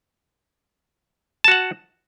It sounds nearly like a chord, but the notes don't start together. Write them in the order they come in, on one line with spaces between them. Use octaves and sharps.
A5 F#4 F#5